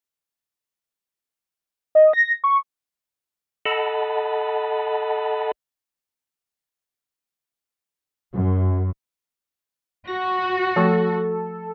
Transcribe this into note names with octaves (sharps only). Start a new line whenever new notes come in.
D#5
A#6
C#6
A4 D#5 F#5 A5 B5
F#2
F#4 A#6
F3 A3 A4 C#6